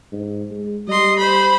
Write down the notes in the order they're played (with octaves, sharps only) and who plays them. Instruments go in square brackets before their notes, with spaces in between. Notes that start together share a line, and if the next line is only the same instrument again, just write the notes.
[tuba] G#2
G#3
[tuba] G3 [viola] D#5 C6
[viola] C5 B5